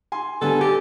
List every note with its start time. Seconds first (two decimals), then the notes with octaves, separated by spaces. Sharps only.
0.12 G#5 C6
0.42 D3 G3 B3 A4 G#5
0.61 G4 A6